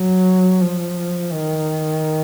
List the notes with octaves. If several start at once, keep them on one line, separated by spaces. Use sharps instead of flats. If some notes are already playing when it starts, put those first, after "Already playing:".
Already playing: F#3
F3
D#3